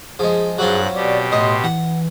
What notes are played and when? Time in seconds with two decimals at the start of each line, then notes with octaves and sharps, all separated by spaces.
0.19 F3 G#3 G#4
0.58 G2 F#3 C4 F4 F#6
0.95 B2 G4 D5
1.32 A1 D#5 C6
1.64 E3 F#5